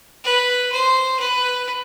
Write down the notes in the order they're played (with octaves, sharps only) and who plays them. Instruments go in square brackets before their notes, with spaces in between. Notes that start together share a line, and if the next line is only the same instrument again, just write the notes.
[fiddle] B4
C5
B4